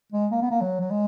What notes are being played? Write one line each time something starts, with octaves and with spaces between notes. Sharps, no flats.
G#3
A#3
B3
A#3
F#3
F#3
G#3